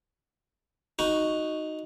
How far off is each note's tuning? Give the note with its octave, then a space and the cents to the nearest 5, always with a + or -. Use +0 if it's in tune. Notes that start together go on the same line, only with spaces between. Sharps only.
D#4 +0 F#4 +0